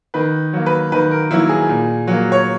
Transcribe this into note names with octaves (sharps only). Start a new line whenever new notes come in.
D#3 B4
F#3 A#3
B4
D#3 B4
A#4
F#3 A#3 E4
G#4
A#2
F#3 A#3
C#5